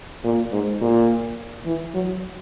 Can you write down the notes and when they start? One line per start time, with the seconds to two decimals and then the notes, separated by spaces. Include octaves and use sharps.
0.24 A#2
0.52 G#2
0.81 A#2
1.66 E3
1.94 F#3